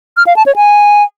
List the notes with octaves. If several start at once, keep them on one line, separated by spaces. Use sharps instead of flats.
F6
F5
A5
C#5
G#5